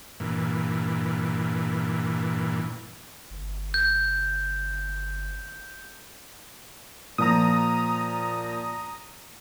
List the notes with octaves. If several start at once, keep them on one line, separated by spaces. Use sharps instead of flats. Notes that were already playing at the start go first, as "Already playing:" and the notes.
G2 A#2 E3
G1
G6
A#2 F3 A#5 D#6